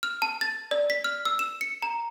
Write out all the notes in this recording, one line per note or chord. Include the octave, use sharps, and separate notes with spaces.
F6
A5
A6
D5
B6
F6
E6
E7
C#7
A#5